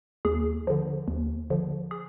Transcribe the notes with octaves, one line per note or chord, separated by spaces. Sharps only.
D#2 G#4
D3 F3
D#2
D3 F3
G#4